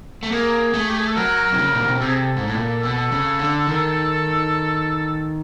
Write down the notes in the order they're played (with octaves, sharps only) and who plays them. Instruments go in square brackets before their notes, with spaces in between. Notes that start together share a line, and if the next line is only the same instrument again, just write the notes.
[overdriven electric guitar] A3
[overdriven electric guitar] A#3 [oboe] G#4
[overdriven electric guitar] A3
[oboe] G4
G#4
A4
[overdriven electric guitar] F#3 [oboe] A#4
[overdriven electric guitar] C3
C#3
A#2
B2
[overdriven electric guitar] C3 [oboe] A4
[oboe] G#4
A4
[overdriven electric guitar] G#2
A2
A#2
[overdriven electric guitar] B2 [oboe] A4
[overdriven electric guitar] C#3
D3
D#3